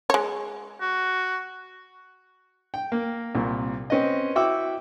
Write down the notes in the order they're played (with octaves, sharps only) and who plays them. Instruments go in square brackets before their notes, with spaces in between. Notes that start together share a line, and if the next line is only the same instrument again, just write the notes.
[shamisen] G#3 C#5
[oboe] F#4
[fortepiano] G5
A#3
C2 A#2
C4 C#4 B4 D#5
E4 F#4 E5 G5 D6 E6